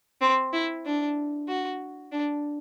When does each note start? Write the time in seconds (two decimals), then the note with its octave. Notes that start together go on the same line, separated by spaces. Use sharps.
0.21 C4
0.53 E4
0.85 D4
1.48 F#4
2.12 D4